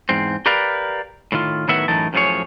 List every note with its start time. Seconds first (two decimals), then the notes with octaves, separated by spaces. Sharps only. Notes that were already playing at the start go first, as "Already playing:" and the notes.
0.09 E2 G#2 C4
0.46 G4 A#4 B4 D5 F5
1.32 A2 D#3 F4
1.68 A2 D#3 F#3 B3 E5 F#5
1.88 F#2 A2 E3 D#4 A#4 A5
2.13 F#2 A2 F3 C#4 G#4 C#5